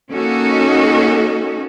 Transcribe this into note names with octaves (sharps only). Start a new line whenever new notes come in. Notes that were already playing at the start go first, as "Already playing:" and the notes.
A#3 C#4 D#4 F#4 A4